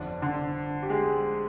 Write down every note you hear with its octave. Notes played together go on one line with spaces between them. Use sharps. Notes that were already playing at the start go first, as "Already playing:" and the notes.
Already playing: G1 F2 D3 D4
D3 D4
G4
G#3 G#4